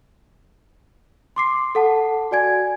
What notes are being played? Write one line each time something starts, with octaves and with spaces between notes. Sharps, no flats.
C6 D6 C7
A4 F#5 A5
F#4 D5 G#5 G#6